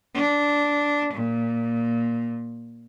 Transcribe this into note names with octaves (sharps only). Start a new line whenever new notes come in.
D4
A#2